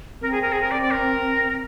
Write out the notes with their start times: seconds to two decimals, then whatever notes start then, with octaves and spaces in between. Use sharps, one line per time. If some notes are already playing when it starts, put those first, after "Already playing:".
0.21 C4 A#4
0.32 G#4
0.42 A#4
0.52 G#4
0.62 A#4
0.71 D5
0.82 D5
0.92 A#4